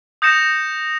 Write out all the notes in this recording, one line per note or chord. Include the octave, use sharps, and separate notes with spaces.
D#6 G6 A#6 C#7 E7